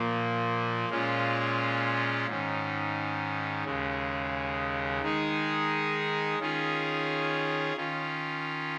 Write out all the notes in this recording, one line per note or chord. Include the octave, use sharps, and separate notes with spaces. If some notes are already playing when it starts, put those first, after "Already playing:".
Already playing: A#2 F3 A#3
A#2 G#3 C#4 F4
G#2 D#3 C#4
D#2 C#3 G#3
D#3 G#3 D#4 G#4
D#3 C#4 F4 G#4
D#3 C#4 F4